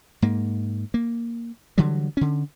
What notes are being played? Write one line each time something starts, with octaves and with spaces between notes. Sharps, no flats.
G#2 A#3
A#3
D3 E3 F#3 G3
D3 C#4